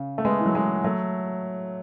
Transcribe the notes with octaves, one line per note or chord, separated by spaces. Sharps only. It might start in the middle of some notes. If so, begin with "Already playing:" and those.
Already playing: C#3
A3
G#3 B3
E3
F#3
E3 G#3
F#3 A3